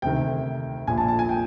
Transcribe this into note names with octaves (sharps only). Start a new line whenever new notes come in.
D2 C3 D#3 G5
A#1 A#2 G#5
A5
A5
G#5
G5